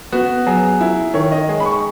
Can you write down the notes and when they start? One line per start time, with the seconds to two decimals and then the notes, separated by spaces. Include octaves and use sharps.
0.13 B3 F#4
0.47 F#3 G#4
0.81 E4
1.14 D#3 C#5
1.32 D#5
1.49 G#3
1.60 B5
1.65 C#6